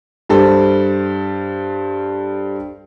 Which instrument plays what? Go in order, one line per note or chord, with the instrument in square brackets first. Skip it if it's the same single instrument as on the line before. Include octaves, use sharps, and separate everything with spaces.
[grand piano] G2 G3 A4 C5